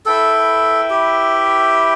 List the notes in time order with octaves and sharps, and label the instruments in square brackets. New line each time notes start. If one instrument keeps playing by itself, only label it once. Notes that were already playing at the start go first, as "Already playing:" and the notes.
[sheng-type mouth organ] E4 B4 E5 G5 [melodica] A4
[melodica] G4